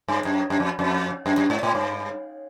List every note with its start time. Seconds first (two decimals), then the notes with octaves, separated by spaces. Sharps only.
0.08 G2
0.25 F#2
0.50 F#2
0.60 F2
0.79 F2
1.26 F#2
1.38 F#2
1.50 G#2
1.63 A2
1.75 G2